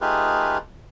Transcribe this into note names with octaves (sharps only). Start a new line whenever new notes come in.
A3 D#4 F4 G4 G#4 B4